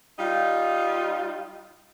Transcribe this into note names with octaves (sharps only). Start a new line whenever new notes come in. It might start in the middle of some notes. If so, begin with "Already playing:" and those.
G3 D#4 F4